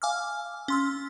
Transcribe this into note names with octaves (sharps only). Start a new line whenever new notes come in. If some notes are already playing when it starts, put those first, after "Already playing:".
F5 G#5 D6 E6 F6
C#4 C6 E6